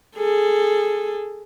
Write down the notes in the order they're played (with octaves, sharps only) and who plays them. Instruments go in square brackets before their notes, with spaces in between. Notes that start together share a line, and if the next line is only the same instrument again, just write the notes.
[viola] G#4 A4